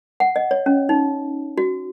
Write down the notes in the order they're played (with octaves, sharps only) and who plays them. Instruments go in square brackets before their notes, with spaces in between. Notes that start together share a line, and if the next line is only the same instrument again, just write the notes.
[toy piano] F#5
D#5
C#5
C#4
D#4
F#4